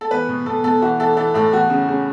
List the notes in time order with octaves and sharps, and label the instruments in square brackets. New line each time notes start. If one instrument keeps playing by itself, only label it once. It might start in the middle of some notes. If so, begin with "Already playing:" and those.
[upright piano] A4
E2 B4
B2
B2 A4
B2 A4
E3 F#4
E3 A4
E3 A4
A2 A4
E2 F#4
C#3
C#3